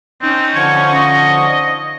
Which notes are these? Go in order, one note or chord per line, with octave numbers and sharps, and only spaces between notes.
C4 C#4 D#4
D3 F3 C#5 C#6
D#5